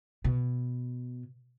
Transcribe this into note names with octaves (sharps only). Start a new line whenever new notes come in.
B2